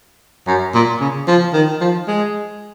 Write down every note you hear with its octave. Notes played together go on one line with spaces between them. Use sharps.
F#2
A#2
C#3
F3
D#3
F3
G#3